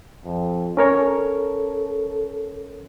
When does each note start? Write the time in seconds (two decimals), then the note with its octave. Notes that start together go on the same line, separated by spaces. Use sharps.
0.25 F2
0.77 C#4 A4 A#4 C#5